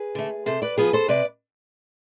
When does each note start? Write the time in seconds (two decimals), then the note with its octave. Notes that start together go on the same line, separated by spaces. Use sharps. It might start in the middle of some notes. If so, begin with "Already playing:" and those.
Already playing: G#4 B4
0.15 D3 A3
0.46 C3 A4 C5
0.62 B4 D5
0.78 F3 B3 G#4 B4
0.93 A4 C5
1.08 C3 B4 D5